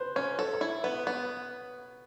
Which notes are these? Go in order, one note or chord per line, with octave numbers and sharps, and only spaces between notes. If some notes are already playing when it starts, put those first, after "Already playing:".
Already playing: B4 C5
C#4 C#5
A4 C#5
C#5
E4
B3 B4
B3